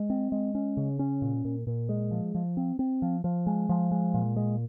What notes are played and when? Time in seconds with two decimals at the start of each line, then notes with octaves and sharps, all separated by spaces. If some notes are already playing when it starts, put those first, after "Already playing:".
Already playing: G#3
0.10 C4
0.32 G#3
0.55 C#4
0.77 C#3
0.99 C#4
1.22 A#2
1.45 A#2
1.67 A#2
1.89 G#3
2.11 F3
2.35 F3
2.57 C4
2.79 C4
3.02 F3
3.24 F3
3.47 G#3
3.69 F3
3.91 G#3
4.14 A#2
4.36 G#3